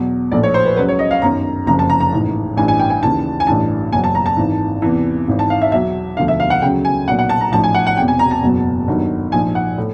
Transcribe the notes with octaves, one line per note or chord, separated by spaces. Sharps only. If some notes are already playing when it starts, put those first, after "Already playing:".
Already playing: E2 B2 F#3
A#1 A2 F3 D5
C#5
C5
B4
C#2 C#3 F#3 B4
C#5
D#5
F5
G1 F#2 D#3 A#5
F#1 F2 C#3 F3 A#5
A5
A#5
A#5
A1 G#2 E3
A1 G2 E3 G#5
G#5
G5
G#5
D#2 C#3 E3 A5
G#5
A1 G2 E3 A5
F#1 E2 B2 F#3 G#5
A5
A#5
A5
G#1 G#2 E3
E2 C3 E3
G#1 G#2 E3
A5
F5
E5
E2 B2 F#3 E5
E1 D2 D3 F3 F5
E5
F5
F#5
C#2 C#3 F#3 G5
G#5
B1 A#2 F#3 F#5
F#5
A5
A#5
A1 G#2 F3 A5
G#5
F#5
F#5
E1 E2 C3 G5
G#5
A#5
A5
F#1 E2 B2 F#3
G1 G2 D#3 F#3
A#1 G#2 F3 G#5
F#5
A2